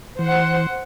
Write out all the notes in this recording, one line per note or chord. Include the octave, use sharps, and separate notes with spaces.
E3 C5 F#5